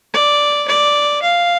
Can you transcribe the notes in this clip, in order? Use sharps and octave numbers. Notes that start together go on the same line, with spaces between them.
D5
D5
F5